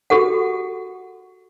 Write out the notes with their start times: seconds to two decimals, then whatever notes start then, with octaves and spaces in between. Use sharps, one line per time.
0.10 F#4 G4 A4 F#5